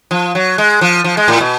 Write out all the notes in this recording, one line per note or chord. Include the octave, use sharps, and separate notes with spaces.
F3
F#3
G#3
F3
F3
G#3
A2
B2